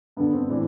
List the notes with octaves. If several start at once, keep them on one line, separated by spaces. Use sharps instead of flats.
G2 D3 B3
C4
A2 E3 D4